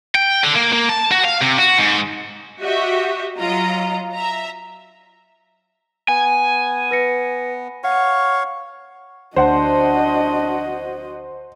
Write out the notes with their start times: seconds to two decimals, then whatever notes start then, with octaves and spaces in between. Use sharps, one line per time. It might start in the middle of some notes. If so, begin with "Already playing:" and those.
0.15 G5
0.44 D3
0.56 A#3
0.72 A#3
0.89 A5
1.12 F#4
1.25 F5
1.42 C3
1.59 F#4
1.78 G#2
2.61 F#4 G4 D#5 E5
3.39 F#3 F4 D#5 A#5
4.13 E5 A#5
6.08 B3 G#5
6.91 B4 A#6 C#7
7.84 C#5 F5 F#5 C#6
9.36 D2 D4 F#4 C5 D#5 F#5